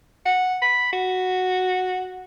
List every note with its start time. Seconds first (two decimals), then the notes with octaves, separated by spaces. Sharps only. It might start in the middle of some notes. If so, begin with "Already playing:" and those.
0.26 F#5
0.62 B5
0.93 F#4